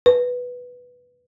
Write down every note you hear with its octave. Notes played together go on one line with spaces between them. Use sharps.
B4